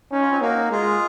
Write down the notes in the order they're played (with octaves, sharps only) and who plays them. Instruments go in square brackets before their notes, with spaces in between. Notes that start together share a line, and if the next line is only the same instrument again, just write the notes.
[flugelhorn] C#4 [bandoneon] D#4
[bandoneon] F4
C4 D#4
[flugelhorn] A#3 [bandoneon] D#4 F#4
[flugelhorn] G#3 [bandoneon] F4 G#4